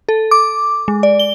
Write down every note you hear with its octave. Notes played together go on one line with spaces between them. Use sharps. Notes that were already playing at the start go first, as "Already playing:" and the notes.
A4
D6
G#3
D5
G7